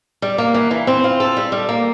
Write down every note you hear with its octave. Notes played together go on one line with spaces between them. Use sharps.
G3
A#3
E3
E3
C4
F4
A4
G3
G3
A#3